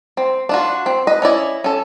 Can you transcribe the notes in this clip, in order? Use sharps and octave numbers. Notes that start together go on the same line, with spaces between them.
C4
D4 F4 F#4
C4
B4 D#5
C#4 E4 D5 D#5
C#4 A4